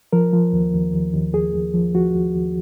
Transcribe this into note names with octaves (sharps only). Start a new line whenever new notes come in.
F3 A#4
F3
D#2
D#2
D#2
D#2
D#2 G#4
D#2
F3
F3 F#4
D#2
D#2